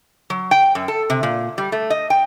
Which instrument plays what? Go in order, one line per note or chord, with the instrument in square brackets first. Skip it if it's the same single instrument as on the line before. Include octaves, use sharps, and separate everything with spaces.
[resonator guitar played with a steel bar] F#3
G5
F#2
A4
C3
A#2
G3
A3
D#5
G5